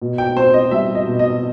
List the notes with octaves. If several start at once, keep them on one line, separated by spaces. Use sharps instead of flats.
B2
G5
C4 C5
D#5
G3 E5
D#5
B2
D#5